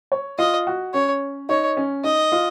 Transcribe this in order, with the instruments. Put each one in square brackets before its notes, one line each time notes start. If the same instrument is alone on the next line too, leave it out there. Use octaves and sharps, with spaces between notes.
[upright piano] C#5
[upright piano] F4 [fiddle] D#5
[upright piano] F#4
[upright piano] C#4 [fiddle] C#5
[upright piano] D#4 [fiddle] C#5
[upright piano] C#4
[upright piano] D#4 [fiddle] D#5
[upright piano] F4